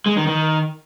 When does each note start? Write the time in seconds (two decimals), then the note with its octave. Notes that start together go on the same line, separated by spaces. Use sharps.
0.06 G#3
0.16 D#3
0.27 D#3